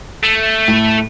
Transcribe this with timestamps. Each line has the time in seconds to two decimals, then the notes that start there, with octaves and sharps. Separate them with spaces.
0.23 A3
0.68 A2